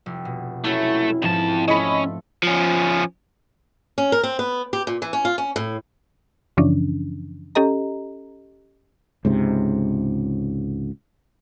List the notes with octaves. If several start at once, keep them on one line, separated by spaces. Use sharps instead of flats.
F1
B2
F#3 A3 C#4 E4
F2 G#2 E3 F3 A5
A3 C#4 F4 A4 D#5 B5
F3 C#4
C#4
A#4
C4
B3
G4
A#2
E3
C#4
F4
C#4
A2
F#2 C#3 E3 F3 C#4 D4
C#4 G4 A4 D#5 A#5
C#2 G#2 C3